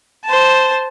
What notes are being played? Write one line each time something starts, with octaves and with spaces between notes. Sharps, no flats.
C5 A5